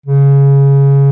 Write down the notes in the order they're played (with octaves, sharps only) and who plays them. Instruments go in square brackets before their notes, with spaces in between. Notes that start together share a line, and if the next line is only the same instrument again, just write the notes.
[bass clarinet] C#3